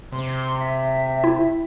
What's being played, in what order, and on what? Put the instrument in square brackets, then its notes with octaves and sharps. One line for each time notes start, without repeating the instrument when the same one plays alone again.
[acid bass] C3 [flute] C6
[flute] E5
[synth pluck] E4